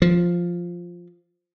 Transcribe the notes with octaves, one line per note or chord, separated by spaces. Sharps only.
F3